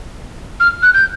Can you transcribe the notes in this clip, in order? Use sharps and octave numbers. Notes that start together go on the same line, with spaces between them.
F6
F#6
G6